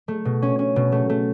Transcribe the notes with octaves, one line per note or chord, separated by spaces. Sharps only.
A3
B2
C#4
C#4
B2
A3
A3